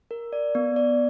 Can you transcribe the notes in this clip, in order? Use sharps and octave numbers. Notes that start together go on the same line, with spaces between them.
A#4
D5
B3
D5